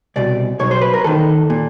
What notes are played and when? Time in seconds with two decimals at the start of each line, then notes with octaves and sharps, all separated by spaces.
0.16 C2 B2 D5
0.59 B1 B2 C#5
0.71 C5
0.82 B4
0.94 A#4
1.04 D#2 D#3 A4
1.50 A#2